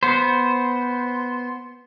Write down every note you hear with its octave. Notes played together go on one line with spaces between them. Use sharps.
B3 C5